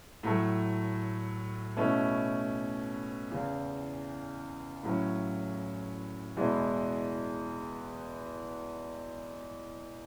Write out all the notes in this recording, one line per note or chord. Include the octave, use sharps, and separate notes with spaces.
A2 F#3 A3
B2 A3 C#4 E4
E2 C#3 E3
A2 F#3 C#4 E4
E2 B2 G#3 B3 E4